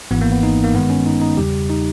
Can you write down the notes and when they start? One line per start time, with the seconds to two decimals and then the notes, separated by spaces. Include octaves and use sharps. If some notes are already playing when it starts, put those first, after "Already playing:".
0.11 G#1 G#2 E3 B3
0.22 A#3
0.32 B3
0.43 D#4
0.64 A#3
0.74 G2 D#3 G#3 B3
0.90 C#4
1.06 D#4
1.22 D#4
1.37 E2 C#3 G3 G4
1.70 D#4